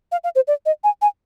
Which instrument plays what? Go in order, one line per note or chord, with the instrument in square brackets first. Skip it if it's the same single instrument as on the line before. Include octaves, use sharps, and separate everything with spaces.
[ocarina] F5
F5
C5
D5
D#5
G#5
G#5